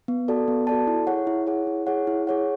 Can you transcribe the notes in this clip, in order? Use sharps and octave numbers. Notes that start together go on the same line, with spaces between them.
B3
F#4 A4 D5 A5
B3
F#4 A4 D5 A5
E4
G#4 C#5 F#5
E4
G#4 C#5 F#5
E4
G#4 C#5 F#5
E4
G#4 C#5 F#5